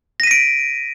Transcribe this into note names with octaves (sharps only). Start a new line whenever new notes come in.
A#6 B6 D7 D#7